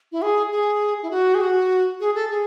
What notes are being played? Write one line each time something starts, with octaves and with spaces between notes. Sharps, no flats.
E4
G#4
G#4
E4
F#4
G#4
F#4
G#4
A4
G#4